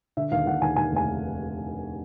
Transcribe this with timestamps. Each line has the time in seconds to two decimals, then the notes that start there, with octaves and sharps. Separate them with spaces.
0.17 D3 E5
0.32 D#2 F5
0.46 D#2 F#5
0.62 D#2 G#5
0.76 D#2 G#5
0.92 F1 G#5